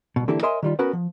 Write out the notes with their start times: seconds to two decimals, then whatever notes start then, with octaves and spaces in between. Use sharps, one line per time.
0.16 C2 B2
0.28 D3 E3 A#3 E4 G4 A4
0.43 A#4 C#5 D#5 E5 G#5 C6
0.63 D#3 G3 F4
0.79 B3 C#4 F#4 A#4 B4
0.93 F3